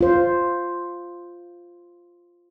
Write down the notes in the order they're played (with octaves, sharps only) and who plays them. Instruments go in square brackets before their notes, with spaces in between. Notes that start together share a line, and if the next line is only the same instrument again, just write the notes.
[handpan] F4 C5